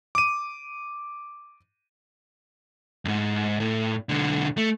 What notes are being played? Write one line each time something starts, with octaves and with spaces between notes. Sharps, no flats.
D6 D#7
F2 G#2
A2
B1 D3
A3